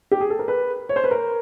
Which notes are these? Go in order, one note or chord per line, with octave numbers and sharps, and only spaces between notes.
G4
G#4
A4
A#4
B4
C#5
C5
B4
A#4